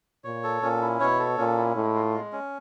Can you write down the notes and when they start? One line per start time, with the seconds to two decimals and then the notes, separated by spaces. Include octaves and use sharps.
0.24 A#2 C#5
0.44 A4
0.62 A#2 C#4
0.82 E4
1.00 B2 C#5
1.19 A4
1.38 A#2 C#4
1.57 E4
1.76 A2 G#3
1.95 F4
2.14 G#3
2.33 C#4